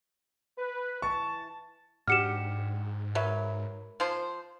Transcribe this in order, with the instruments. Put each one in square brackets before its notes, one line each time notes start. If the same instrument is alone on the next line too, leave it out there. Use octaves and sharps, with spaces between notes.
[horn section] B4
[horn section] E3 A5 [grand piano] C#6
[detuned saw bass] G#2 [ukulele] D4 F#4 G4 [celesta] F6 C#7 E7
[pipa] F#3 [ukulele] A#4 B4 E5
[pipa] F3 C5